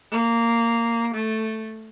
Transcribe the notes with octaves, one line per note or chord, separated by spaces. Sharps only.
A#3
A3